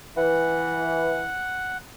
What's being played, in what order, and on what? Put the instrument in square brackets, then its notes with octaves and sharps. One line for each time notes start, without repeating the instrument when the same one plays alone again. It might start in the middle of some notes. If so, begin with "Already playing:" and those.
[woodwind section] E3 [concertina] F#5